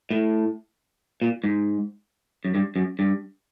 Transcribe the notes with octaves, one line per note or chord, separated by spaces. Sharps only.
A2
A#2
G#2
F#2
G2
F#2
G2